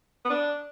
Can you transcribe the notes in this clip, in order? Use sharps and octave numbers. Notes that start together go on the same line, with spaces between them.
B3
D4